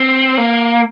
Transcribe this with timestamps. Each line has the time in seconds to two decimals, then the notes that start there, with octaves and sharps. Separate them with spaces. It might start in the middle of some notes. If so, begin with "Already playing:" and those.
Already playing: C4
0.38 A#3